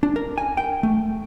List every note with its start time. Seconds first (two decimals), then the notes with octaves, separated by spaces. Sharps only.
0.03 D4
0.16 A#4
0.38 G#5
0.57 G5
0.83 A3